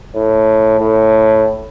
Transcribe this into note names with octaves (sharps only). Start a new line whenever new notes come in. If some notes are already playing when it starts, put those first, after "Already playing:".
A2
A2